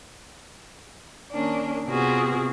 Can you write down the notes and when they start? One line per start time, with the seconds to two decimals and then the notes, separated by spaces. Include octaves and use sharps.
1.31 D#3 A#3 C#4 D4
1.88 C3 B3 C4 F4 F#4 G#4